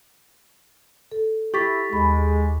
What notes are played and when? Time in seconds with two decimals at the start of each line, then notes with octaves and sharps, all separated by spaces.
1.12 A4
1.54 E4 G4 C#6 A6 B6
1.93 D#2 G#3 B5